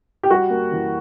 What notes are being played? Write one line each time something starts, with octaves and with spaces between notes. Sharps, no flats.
G4
G3 F#4
A#3
E3